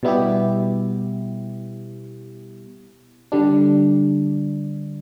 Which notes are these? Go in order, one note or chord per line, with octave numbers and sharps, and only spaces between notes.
B2 G3 B3 E4 G4
D3 G3 D4